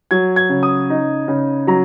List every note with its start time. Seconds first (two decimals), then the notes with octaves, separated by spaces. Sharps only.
0.11 F#3 G#6
0.36 G#6
0.49 C#3
0.63 D#6
0.90 D#4
1.28 C#3
1.67 F#3 A#5